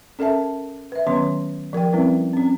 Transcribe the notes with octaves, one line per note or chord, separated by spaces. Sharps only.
C#4 A4 A#4 E5 A5
B4 E5
D#3 F#3 B3 C#4 B4 C6
F3 A#4 D5 G5
G3 C4 C#4 E4 B4
C4 C#4